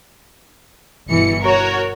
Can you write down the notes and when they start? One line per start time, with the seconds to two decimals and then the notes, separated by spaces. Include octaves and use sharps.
1.09 G1 B2 E3 C#7
1.43 F#4 A#4 C#5